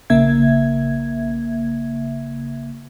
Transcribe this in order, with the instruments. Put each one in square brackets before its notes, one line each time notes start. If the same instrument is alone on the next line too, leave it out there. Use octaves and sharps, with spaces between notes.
[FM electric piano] A#1 C#3 A#3 E5 G#6